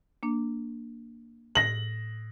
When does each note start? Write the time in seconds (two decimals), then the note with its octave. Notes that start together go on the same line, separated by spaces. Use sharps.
0.23 A#3 D4
1.55 A2 A#6 F#7